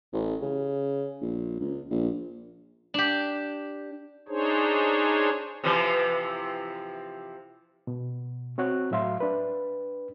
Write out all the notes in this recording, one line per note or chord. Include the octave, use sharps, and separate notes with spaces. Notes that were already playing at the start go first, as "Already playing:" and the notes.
A1
C#3
A#1
C#2
A#1
D4 G4
D4 D#4 G#4 C5 C#5
C3 E3 F3
B2
C4 F#4 C#5 F#6
A2 F#3 E5 F5 C6
D4 B4